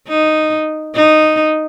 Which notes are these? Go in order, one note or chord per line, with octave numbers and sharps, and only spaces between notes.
D#4
D#4